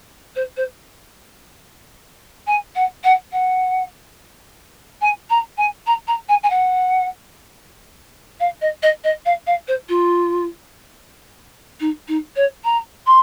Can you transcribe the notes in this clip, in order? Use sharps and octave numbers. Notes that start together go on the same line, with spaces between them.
C5
C5
G#5
F#5
F#5
F#5
G#5
A#5
G#5
A#5
A#5
G#5
G#5
F#5
F5
D#5
D#5
D#5
F5
F5
C5
F4
D#4
D#4
C#5
A#5
C6